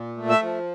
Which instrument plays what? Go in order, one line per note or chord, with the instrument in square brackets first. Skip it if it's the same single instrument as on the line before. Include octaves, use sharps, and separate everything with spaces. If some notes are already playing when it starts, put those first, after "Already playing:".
Already playing: [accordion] A#2
A3
E5
F3